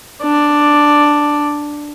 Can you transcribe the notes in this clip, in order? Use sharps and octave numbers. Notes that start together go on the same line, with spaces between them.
D4 D5